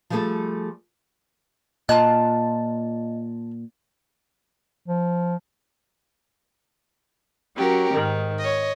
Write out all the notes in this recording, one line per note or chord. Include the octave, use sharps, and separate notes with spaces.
F3 G3 A3 G#4 A4
A#2 F4 D#5 A5 F#6
F3
F#3 C#4 G4 A#4
G#2 D#3
C#5 D#5